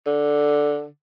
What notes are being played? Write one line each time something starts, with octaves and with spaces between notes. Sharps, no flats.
D3